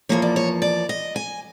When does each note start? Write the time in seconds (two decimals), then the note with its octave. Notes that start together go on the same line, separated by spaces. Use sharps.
0.09 E2 C3 F3 A#3 C#5
0.22 D5
0.36 C#5
0.62 D5
0.89 D#5
1.16 G#5